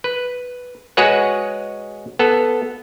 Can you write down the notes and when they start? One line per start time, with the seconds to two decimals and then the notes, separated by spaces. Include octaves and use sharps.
0.04 B4
0.97 G#3 F#4 G#4 B4 C#5 F#5
2.19 B3 A4